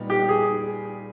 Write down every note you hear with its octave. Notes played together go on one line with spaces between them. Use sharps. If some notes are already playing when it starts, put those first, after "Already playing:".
Already playing: A#2 G3 B3 D#4
G4
G#4